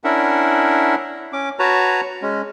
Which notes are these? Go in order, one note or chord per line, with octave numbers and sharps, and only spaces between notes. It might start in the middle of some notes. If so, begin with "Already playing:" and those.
C#4 D4 E4 A#4 E5 F#5
C#4 D6
F#4 B4 C#5 A5 A#5
G#3 C#4